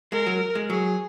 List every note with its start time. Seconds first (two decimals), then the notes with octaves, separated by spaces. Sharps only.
0.12 G#3 A#4
0.27 F#3
0.55 G#3
0.70 F#3 G#4